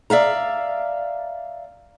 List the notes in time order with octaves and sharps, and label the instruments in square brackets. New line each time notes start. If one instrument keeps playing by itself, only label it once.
[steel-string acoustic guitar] D5 E5 F5 A#5